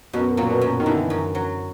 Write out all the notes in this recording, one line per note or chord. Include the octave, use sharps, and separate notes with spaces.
F#2 B2
A#2 F#3
B2
F#2
D#3
D3 E3
F#2
F#3